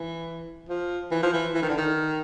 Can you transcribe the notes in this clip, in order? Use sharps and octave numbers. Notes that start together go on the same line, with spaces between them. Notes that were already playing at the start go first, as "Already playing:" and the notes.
Already playing: E3
F3
E3
F3
E3
E3
D#3
D3
D#3